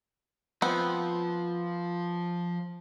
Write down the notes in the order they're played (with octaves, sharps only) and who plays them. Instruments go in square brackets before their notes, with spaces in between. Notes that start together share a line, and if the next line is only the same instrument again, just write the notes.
[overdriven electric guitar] F3 [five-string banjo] B3 C4 F#5